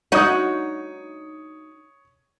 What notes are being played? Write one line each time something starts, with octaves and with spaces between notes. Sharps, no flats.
D#4 F#4 C#5 D#6